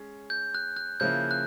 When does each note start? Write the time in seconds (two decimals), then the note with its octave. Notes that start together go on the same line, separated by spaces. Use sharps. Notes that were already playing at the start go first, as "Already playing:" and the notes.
Already playing: G#3 C#4
0.30 G6
0.54 F#6
0.77 F#6
1.00 C#3 F3 A#3 C#4 E4 G6
1.31 F#6